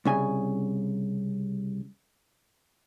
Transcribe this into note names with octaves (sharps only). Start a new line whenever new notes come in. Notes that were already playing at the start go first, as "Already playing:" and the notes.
C2 C#3 G#5